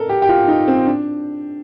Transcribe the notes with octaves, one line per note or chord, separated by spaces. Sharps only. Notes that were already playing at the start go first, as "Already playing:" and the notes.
Already playing: A4 A#4
G4
G4
F4
D#4
C4
D4